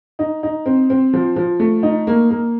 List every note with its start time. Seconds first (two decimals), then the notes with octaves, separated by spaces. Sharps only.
0.19 D#4
0.43 D#4
0.66 C4
0.90 C4
1.13 F3
1.36 F3
1.60 A3
1.83 D#4
2.07 A#3
2.31 A#3